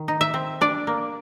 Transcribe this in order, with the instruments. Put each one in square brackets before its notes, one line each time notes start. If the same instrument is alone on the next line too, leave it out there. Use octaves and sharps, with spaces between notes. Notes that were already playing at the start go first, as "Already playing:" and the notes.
Already playing: [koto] D#3
D#4
E5
C4
D4 D5
A#3